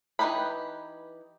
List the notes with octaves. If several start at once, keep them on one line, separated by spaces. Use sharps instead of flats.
E3 D#4 G4 B4 B5